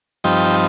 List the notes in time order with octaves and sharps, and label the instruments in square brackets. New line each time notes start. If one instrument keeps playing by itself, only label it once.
[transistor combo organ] G2 F3 C4 D#4 G5